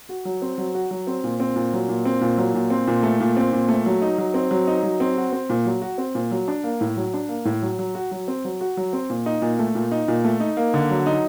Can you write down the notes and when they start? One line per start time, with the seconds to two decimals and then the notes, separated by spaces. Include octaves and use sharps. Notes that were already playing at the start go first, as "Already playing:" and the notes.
0.09 F#4
0.25 F#3
0.42 C4
0.58 F#3
0.74 F#4
0.91 F#3
1.07 C4
1.24 A#2
1.40 C4
1.56 A#2
1.73 F#3
1.89 A#2
2.05 C4
2.21 A#2
2.38 F#3
2.54 A#2
2.70 C4
2.87 A#2
3.03 A3
3.20 A#2
3.37 C4
3.53 A#2
3.69 A3
3.86 F#3
4.02 D#4
4.18 F#3
4.34 C4
4.51 F#3
4.67 D#4
4.83 F#3
5.00 C4
5.17 F#4
5.32 C4
5.50 A#2
5.65 F#3
5.81 F#4
5.98 C4
6.15 A#2
6.31 F#3
6.48 D4
6.64 A#3
6.81 A2
6.96 F#3
7.14 D4
7.29 A#3
7.45 A2
7.62 F#3
7.79 F#3
7.95 F#4
8.11 F#3
8.28 C4
8.45 F#3
8.61 F#4
8.77 F#3
8.93 C4
9.10 A#2
9.26 D#4
9.42 A#2
9.59 A3
9.75 A#2
9.92 D#4
10.08 A#2
10.24 A3
10.40 D#4
10.57 A#3
10.74 D3
10.90 F#3
11.06 D#4